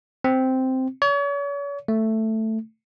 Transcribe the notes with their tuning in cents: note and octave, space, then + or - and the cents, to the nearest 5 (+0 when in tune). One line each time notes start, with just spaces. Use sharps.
C4 -5
C#5 +40
A3 +5